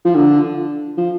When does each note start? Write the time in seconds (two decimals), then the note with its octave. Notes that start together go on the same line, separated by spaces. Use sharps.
0.05 F3
0.15 D3
0.98 F3